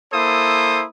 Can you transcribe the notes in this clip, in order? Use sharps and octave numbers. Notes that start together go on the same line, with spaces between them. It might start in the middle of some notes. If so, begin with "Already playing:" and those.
A#3 E4 A4 C5 D#6